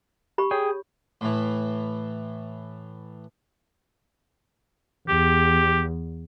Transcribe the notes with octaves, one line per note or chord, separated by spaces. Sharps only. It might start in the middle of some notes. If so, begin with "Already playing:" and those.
G4 B5 C#6
G#4 C#5 G5
A2 E3
E2 G4